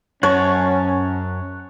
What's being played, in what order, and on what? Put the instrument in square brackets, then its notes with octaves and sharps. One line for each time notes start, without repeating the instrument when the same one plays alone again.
[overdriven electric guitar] F#2 [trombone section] C#4 [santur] C#5 [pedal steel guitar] F#5 A5 C#6